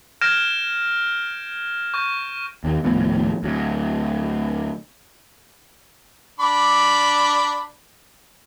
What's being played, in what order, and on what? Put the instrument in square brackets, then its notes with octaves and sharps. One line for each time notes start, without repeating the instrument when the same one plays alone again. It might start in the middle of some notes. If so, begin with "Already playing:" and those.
[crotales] F6 G6 G#6 A#6 D7 E7
C#6 G6
[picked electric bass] D#2
D#1 A2 F3 B3
D2 F#3
[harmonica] D4 B5 D6